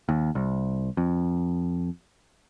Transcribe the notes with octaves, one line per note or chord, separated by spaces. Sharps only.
D#2
C2
F2